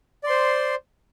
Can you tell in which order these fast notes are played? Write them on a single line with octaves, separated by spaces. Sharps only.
D5 C6 C5